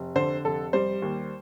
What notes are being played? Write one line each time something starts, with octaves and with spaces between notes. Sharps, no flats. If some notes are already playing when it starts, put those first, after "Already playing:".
Already playing: F1
D3 C5
F1 A4
G3 C5
D#2